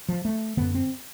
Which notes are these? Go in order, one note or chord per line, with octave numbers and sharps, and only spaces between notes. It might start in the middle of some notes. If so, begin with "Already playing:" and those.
F3
A3
F#2 D3 B3
C4